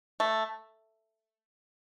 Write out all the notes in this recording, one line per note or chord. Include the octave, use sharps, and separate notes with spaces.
A3